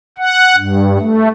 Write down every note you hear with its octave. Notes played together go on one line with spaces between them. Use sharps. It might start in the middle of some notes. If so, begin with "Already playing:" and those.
F#5
G2
A3